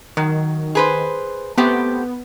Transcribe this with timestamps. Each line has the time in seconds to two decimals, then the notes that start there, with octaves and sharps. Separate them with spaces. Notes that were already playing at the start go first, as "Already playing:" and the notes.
0.17 D#3 F#3
0.75 G#4 B4 C5
1.58 A3 B3 C4 G4